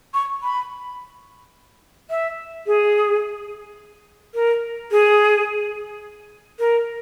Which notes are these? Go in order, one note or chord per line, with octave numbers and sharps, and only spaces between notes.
C#6
B5
E5
G#4
A#4
G#4
A#4